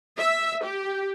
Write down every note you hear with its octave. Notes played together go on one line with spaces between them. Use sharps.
E5
G4